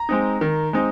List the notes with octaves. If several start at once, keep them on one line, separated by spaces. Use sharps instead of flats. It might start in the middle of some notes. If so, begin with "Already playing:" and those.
Already playing: A#5
G#3 C4 D#4
D#3
G#3 C4 D#4